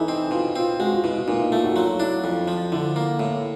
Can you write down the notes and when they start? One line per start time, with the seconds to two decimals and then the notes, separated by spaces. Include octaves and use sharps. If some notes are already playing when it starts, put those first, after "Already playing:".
Already playing: E3 D#4 E4 A4
0.08 C4
0.31 B2 F4
0.56 C4 F4
0.79 G#3 F#4
0.92 F4
1.04 B2 E4
1.16 E4
1.28 A#2 D#4
1.40 E4
1.52 A3 F4
1.64 F#4
1.76 F#3 F4
2.00 D4 E4
2.24 F2
2.48 F3
2.72 D3 E4
2.96 A#3
3.19 A2